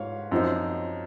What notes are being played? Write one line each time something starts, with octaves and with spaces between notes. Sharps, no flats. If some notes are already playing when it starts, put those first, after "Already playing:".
Already playing: G#2 C#5 F5
F#2 F3 C4 D#4